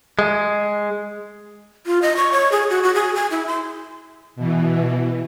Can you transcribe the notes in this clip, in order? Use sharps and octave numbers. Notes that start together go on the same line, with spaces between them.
G#3
F4
D#5
C#6
C#5
G#4
F#4
F#4
G#4
G#5
E4
C6
B2 E3